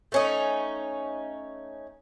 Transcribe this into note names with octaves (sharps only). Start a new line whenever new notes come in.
A3 C#4 D#4